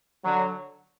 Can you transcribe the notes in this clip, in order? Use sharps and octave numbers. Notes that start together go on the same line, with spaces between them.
D3 F#3